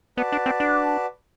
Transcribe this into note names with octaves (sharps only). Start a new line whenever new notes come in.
B3 F#4 B4 D5 A5
D4
C4
D4